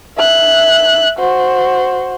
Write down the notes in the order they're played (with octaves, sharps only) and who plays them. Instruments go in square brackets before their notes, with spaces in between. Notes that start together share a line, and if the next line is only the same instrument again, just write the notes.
[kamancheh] E5 F#6
F#4 C5